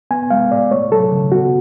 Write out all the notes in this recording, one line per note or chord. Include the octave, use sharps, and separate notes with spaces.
B3 G#5
G#3 F5
A2 D5
A3 C#5
F#3 A4
C#3
B3 F#4